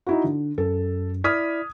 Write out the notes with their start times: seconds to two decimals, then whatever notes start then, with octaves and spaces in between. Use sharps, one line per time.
0.07 D#4 E4 F#4
0.24 D3
0.58 F#2 A4
1.24 E4 D5 D#6 F6 G#6 B6